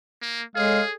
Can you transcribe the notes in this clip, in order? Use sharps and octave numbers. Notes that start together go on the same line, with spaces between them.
A#3
G#3 G#4 A4 C#5 F5 G#5